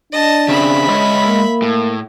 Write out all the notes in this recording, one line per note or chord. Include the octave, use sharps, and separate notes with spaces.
D4 D#5 A5
C#3 C4 C#4 E5 B5
G#3 C#5 D#5
A#3
A2